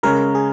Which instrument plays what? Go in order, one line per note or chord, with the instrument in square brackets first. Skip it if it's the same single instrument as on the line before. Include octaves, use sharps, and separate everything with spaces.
[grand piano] C#3 G#3 C#4 [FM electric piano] A#4
[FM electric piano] G#4